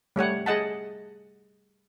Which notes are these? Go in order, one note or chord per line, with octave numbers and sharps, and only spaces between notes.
G3 A3 C#5 F#5
G#4 D#5 F#5 A5